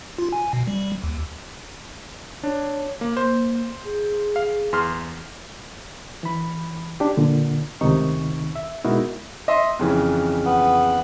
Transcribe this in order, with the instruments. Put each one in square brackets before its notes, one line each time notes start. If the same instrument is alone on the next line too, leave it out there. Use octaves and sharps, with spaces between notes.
[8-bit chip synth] F4
G#5
B2
G3
D#2
[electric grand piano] D4 [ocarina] C#5
[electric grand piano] A#3
[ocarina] A#3 [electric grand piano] C5
[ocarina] G#4
[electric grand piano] F5
E2 C6 F6
[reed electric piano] E3 B5
D4 G4
A#2 D3
C#2 A2 C3 D#3 D#4 C#6
E5
B2 G#3 D#4 E4 F#4 A#4
[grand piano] D#5 E5 C6
F2 C#3 E3
[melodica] B3